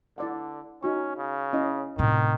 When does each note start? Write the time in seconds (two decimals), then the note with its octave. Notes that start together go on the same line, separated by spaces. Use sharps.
0.18 D3 E4 D5 F#5
0.83 C#4 D#4 F#4 C#6
1.17 C#3
1.53 C#4 E4 D#5
1.98 A2 C3 D#3